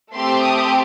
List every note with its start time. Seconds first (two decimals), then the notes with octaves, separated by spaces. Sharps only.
0.14 A3 C4 G4 C6
0.43 D#6